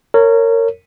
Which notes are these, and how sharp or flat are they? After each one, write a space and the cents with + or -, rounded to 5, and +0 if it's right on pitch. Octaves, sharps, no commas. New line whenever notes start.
A#4 -25 C#5 +0